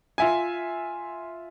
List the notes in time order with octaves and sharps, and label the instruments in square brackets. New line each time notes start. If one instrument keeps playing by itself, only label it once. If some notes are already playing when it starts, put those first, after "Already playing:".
[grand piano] F4 E5 G#5